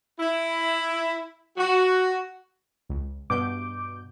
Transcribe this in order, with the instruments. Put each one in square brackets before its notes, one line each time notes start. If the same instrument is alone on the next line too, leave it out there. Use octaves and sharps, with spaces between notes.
[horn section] E4
F#4
[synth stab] C#2
[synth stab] G2 B2 G6 [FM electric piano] D6